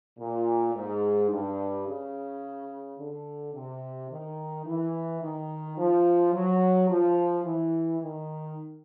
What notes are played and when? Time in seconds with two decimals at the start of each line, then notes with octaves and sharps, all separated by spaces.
0.19 A#2
0.74 G#2
1.30 G2
1.86 C#3
2.98 D3
3.53 C3
4.09 D#3
4.65 E3
5.21 D#3
5.77 F3
6.33 F#3
6.89 F3
7.44 E3
8.00 D#3